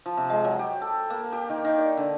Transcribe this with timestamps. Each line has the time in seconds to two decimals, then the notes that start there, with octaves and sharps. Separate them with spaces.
0.06 F3
0.17 C3
0.30 G#3
0.44 F#3
0.59 G4
0.82 A4
1.10 A#3
1.32 G4
1.49 D#3
1.65 D#3
1.78 D5
1.97 D3